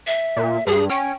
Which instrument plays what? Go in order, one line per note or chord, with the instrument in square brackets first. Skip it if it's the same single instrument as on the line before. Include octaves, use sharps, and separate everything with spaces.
[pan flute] E5
[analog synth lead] A#2
[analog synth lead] G2 [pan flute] G#4
[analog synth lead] C#4 [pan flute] G5